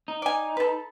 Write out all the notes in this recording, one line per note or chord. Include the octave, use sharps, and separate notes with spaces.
D#4
D5 G#5
A4 B4